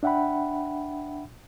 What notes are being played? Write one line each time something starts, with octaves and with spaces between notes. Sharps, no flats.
D4 E5 F#5 G5 B5